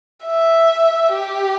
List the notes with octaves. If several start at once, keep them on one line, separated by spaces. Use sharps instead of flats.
E5
G4